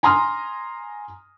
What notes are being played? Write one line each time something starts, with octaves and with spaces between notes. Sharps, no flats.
G#5 A#5 C6 D#6 F6